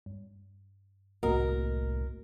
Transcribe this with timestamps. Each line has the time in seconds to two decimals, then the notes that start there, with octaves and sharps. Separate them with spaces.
0.06 G2
1.23 G1 C2 A2 A#3 F#4 A#4 D#5